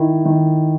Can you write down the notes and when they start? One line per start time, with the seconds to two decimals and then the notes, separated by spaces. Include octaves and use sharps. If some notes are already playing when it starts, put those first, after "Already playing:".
Already playing: D#3 E4
0.25 D#3